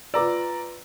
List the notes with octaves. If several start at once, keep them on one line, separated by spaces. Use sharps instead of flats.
F4 B4 D5 A#5 D6 E6